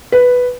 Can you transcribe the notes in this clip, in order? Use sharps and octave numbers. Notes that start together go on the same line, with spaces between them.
B4